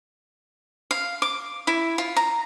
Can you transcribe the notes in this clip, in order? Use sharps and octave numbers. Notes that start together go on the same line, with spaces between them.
F5
D6
E4
F4
A#5